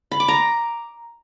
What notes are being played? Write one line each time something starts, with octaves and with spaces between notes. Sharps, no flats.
B5
D6
A#5